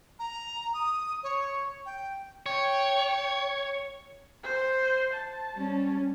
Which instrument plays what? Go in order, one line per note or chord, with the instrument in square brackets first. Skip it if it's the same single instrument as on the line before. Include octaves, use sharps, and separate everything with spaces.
[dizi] A#5
D#6
C#5
G5
[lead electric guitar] C#5 [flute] G5
[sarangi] C5
A5
[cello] G3 C#4